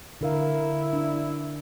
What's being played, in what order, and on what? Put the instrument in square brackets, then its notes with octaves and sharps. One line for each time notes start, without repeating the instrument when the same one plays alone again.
[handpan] D3 A#4 F5 [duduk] E4
[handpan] D4